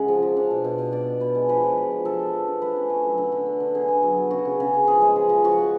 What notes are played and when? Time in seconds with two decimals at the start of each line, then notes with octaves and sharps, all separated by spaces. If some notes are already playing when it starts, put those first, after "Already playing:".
Already playing: C#3 G#3 F#5
0.08 F3
0.22 F3
0.36 D4 F5
0.51 B2
0.64 B2
0.78 B2
0.92 B2 D5
1.07 B3
1.20 B2 B4
1.35 G#3
1.49 F3 B4
1.63 F3
1.77 F3
1.91 F3
2.05 F3 A4
2.20 B3
2.33 F3
2.48 D4
2.62 A3 B4
2.76 C#4
2.90 A3
3.04 F#3
3.18 D3
3.32 D3
3.46 B3
3.60 D3
3.75 D3 G#4
3.88 B3
4.03 F#3
4.17 F#3
4.31 C#3 F#4
4.45 C#3
4.60 C#3
4.74 C#4
4.87 F3 G#4
5.01 G#3
5.16 F3
5.29 F3
5.44 F3 F#4
5.58 B3